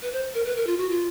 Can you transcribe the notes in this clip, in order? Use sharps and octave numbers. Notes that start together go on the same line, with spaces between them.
B4
C5
A#4
B4
A#4
F4
F#4
F4